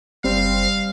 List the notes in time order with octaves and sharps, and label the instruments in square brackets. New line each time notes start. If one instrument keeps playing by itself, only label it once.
[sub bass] F#1 [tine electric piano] G3 [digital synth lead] C4 [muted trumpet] F5